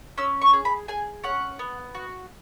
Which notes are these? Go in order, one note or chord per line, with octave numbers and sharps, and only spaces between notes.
C#4 E6
C#6
G#4
B5
G#4 G#5
C#4 F#5
B3
F#4